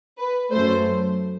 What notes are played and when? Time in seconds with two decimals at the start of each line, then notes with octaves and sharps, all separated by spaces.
0.19 B4
0.52 F#2 F#3 A3 C5